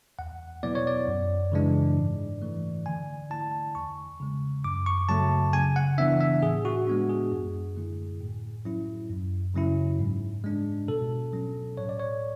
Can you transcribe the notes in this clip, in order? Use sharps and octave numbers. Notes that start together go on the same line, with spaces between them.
E2 F#5
B2 F#3 B3 E4 D5
C#5
D5
F#2
C#3 E3 G#3 D4
G#2
E3 A3
D3 G#5
A3 E4 A5
E2 C#6
C#3 G#3
F#2 D6
C#6
C#3 F#3 A3 A5
C#3 G#5
F#5
E3 B3 D4 E5
E5
A2 G#4
F#4
G#3 B3 D4
G#4
F#2
D3 A3 E4
A2
F#3 C#4 E4
F#2
C#3 F#3 C#4 E4
G#2
G#3 D4
B2 A4
F#3 C#4
A2 C#5
D5
C#5